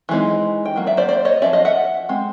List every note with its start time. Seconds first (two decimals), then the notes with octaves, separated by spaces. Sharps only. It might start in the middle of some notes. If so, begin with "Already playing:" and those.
0.09 E3 G#3 C4 D#4
0.66 G5
0.76 F#3 A#3
0.87 D5 E5
0.97 C5 D5
1.09 C5 D5
1.25 C#5 D#5
1.42 F3 A#3 C#4 D5 E5
1.53 D#5 F5
1.65 E5 F#5
2.09 G#3 C4